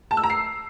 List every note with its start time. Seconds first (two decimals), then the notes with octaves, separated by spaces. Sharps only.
0.11 A5
0.17 E6
0.24 A#5
0.30 C7